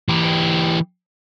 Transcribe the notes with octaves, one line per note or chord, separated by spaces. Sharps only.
E3 G4